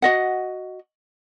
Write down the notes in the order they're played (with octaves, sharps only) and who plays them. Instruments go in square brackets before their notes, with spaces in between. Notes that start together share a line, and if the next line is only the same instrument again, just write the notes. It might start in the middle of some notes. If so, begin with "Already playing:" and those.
[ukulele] F#4 D#5 F#5